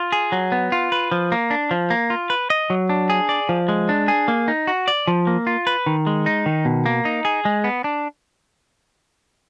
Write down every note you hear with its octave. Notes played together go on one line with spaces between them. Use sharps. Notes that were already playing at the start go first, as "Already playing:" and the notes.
Already playing: F4
G#4
F#3
B3
F4
B4
F3
A#3
D4
F3
A#3
F4
B4
D#5
F#3
D4
G#4
D5
F3
G#3
D4
G#4
A#3
D#4
F#4
D5
F3
A#3
F4
B4
D#3
G#3
D#4
D#3
B2
A#3
D#4
G#4
G#3
B3
D4